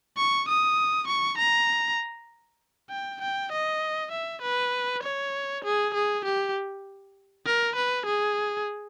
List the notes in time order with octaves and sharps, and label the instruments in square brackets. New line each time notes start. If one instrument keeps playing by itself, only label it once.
[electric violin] C#6
D#6
C#6
A#5
G5
G5
D#5
E5
B4
C#5
G#4
G#4
G4
A#4
B4
G#4